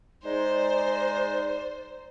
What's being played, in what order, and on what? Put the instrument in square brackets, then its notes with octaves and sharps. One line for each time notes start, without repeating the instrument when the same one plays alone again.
[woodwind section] G#3 D#4 [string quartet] C5 [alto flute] D5